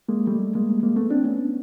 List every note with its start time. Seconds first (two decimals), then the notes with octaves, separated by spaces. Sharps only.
0.09 G#3 A#3
0.27 G3 A3
0.55 G#3 A#3
0.83 G#3 A#3
0.97 A3 B3
1.11 C4 D4
1.25 B3 C#4